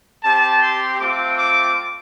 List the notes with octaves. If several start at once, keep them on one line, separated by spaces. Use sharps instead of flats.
C4 G4 A5
C6
A3 C4 F4 D6
D6